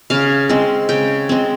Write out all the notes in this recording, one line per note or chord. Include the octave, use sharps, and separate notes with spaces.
C#3 F5
G#3 C4
C#3 G5
G#3 C4